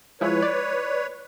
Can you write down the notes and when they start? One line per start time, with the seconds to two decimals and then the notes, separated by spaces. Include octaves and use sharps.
0.21 F3 G#3 E4 B4 C#5
0.42 D5